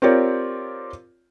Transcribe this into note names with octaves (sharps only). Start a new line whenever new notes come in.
C4 F4 G4 A#4 C#5 D5